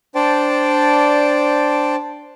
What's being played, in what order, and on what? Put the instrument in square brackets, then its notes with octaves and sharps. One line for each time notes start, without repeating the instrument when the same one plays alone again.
[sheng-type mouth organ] D4 C5 D5 G5 A5